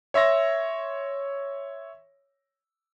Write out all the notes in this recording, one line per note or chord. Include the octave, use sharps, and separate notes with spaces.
C#5 E5 C6 A#6